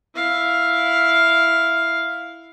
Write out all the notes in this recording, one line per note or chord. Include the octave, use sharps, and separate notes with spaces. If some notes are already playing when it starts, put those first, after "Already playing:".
E4 F5